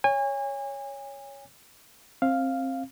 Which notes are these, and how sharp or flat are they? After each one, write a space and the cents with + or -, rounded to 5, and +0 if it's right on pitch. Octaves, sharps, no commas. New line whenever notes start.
C#5 +5 G#5 -30
C4 +25 F5 +0